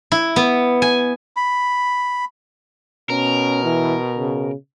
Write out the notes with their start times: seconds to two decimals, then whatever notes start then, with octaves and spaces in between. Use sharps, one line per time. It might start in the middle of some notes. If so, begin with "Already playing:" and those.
0.12 E4
0.36 B3
0.82 G#5
1.36 B5
3.10 B2 C#4 A#4
3.64 E3
4.18 C#3